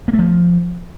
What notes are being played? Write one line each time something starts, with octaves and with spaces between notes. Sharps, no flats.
A#3
A3
F3